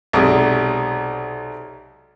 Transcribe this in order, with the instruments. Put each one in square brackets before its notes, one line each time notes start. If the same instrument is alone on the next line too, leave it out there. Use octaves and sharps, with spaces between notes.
[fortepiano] B1 C3 G#3 D5 D#6